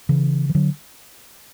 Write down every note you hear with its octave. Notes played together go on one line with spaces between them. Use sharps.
C#3 E3
E3
D3 F#3